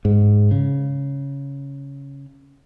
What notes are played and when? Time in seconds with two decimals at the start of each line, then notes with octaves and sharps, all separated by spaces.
0.05 G#2
0.51 C#3